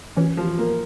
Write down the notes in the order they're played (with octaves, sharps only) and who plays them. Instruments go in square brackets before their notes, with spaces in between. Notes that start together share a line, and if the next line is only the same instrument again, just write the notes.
[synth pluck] E3 [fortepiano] C#4
[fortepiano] F3
A#3